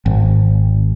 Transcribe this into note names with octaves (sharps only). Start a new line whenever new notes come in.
G#1